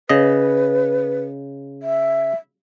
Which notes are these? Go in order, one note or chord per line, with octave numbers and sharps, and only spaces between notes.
C#3 B4 D#5
E5